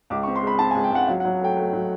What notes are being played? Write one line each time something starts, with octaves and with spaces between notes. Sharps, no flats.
C#2 D6
C#6
C4
C6
G#3 B5
C4 A5
G#5
C#2
G5
C#2 F#5
F#3 F5
F#5
F#3
A3 G5
A3
F#3